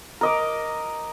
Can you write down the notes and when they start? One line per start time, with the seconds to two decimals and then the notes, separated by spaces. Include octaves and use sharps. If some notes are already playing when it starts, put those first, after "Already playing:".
0.21 A#4 D#5 D6